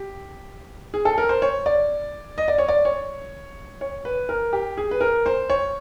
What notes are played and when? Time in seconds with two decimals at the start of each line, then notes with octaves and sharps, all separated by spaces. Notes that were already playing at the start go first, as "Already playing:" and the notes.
Already playing: G4
0.94 G#4
1.05 A4
1.18 A#4
1.29 C5
1.42 C#5
1.66 D5
2.38 D#5
2.48 D5
2.58 C#5
2.68 D5
2.85 C#5
3.81 C#5
4.05 B4
4.29 A#4
4.53 G4
4.78 G#4
4.91 B4
5.01 A#4
5.26 C5
5.50 C#5